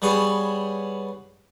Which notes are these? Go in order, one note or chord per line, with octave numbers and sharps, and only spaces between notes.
G3 B3 G#4 C#5